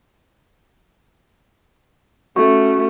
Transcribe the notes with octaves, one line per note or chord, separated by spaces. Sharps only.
A3 C#4 F#4